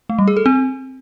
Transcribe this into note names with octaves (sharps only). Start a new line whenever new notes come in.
A3
G3
G#4
A4
C4